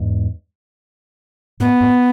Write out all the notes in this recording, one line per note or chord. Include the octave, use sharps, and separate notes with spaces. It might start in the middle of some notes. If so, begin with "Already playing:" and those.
Already playing: E2 G#2
F#2 A2 B3
F#2 A2